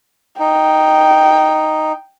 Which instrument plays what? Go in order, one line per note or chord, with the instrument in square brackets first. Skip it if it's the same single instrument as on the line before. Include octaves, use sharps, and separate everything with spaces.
[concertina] D#4 [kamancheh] G5